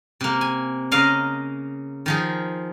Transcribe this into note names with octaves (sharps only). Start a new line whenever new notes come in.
C3 A#3
G#5
C#3 A#4 D#5 F5
D#3 F3 G#4